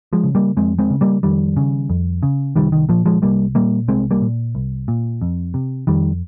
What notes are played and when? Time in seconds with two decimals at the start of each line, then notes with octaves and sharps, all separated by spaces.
0.13 F3 G#3
0.24 C#3
0.35 G3 A#3
0.57 F2 G#3 C4
0.79 G#3 C4
0.90 C#3
1.01 G3 A#3
1.23 F2 D#3 G3
1.57 C#3
1.90 F2
2.23 C#3
2.56 C2 D#3 G3
2.72 D#3
2.89 A#2 F3
3.06 F3 G#3
3.22 C2 G3 A#3
3.55 A#2 G3 A#3
3.88 C2 G#3 C4
4.11 G3 A#3
4.22 A#2
4.55 C2
4.88 A#2
5.21 F2
5.54 C3
5.87 F2 D#3 G3